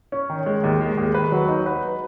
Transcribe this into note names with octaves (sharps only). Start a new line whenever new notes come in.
C#4
D#3
G#3
D#2
G#3
D#2
B4
F#3
D#4
B4